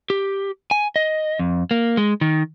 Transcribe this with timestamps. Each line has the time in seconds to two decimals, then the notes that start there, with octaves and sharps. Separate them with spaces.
0.10 G4
0.71 G#5
0.96 D#5
1.39 F2
1.71 A#3
1.97 G#3
2.21 D#3